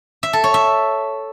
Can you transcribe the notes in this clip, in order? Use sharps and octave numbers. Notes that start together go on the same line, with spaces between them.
E5
A4
C#5
E5